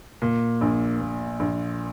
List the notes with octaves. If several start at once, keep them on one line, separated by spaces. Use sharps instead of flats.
A#2
A#1
A#2
A#1